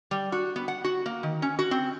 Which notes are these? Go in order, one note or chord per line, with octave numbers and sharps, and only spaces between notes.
G3
F#4
B3
F#5
F#4
A#3
D#3
C#4
F#4
C4